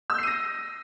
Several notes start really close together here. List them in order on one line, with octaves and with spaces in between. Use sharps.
E6 G6 C7 D#7 A#6